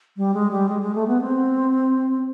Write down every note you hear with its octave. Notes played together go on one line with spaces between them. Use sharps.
G3
G#3
G3
G#3
G#3
A3
B3
C4